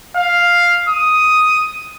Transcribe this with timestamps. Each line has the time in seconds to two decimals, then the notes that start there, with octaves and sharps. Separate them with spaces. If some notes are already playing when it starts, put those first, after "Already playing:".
0.17 F5
0.89 D#6